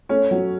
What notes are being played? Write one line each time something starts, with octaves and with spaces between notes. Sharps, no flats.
A3 C#4 C#5
F#3